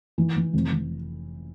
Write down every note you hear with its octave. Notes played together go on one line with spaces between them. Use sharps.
E3
E3
F1
F1